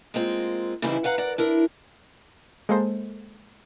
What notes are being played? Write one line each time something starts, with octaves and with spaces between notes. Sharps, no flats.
G#3 A#3 C4 F4
C#3 E3 G3 C4 D#4 E4
B4 F5 F#5 A#5
A#4 D5 F#5
D4 E4 A#4
G#3 A#3 A4 C5